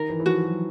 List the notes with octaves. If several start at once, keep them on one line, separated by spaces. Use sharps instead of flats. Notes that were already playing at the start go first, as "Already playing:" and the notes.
Already playing: D#3 A#4
E3
E3
F3 F#4
F#3